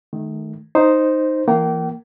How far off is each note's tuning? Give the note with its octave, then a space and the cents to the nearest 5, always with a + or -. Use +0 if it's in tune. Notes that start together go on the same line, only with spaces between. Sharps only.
D#3 +0 A3 -30
D#4 +0 C5 +0
E3 +20 A#3 -10 G5 -35